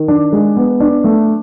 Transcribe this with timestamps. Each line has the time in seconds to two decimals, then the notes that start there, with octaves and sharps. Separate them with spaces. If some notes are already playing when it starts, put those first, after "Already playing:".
Already playing: D#3
0.08 D4
0.32 G#3
0.57 B3
0.80 D4
1.04 A3